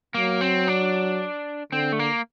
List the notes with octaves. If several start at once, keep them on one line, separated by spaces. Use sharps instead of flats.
F#3 A#3
C4
D4
D3 C4
A3
A#3